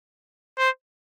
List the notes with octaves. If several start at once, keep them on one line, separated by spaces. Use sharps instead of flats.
C5